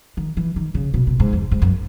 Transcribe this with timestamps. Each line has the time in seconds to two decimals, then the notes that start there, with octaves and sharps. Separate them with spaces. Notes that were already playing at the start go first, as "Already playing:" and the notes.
0.17 D#3
0.37 E3
0.56 D#3
0.75 C#3
0.94 B2
1.07 B2
1.20 G#2
1.33 E2
1.51 G#2
1.62 F#2